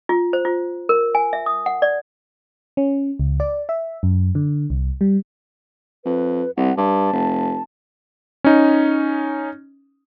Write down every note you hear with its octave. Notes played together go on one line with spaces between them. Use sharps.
F4
C5
F4
A#4
G#5
E5
D#6
F#5
D5
C#4
C#2
D5
E5
F#2
D3
C2
G3
F2 B4
C2 F#5
G2 A5
F1
C#4 D#4